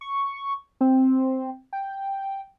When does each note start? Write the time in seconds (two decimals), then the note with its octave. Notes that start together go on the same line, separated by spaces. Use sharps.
0.01 C#6
0.81 C4
1.73 G5